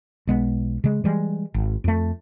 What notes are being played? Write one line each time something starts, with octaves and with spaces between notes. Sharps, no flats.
B1 G#3 B3
C#3 G#3
E3 G3 G#3
G#1
F2 A3